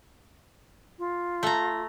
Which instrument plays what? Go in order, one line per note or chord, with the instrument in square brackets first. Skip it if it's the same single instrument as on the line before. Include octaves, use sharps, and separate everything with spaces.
[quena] F4
[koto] A3 A#5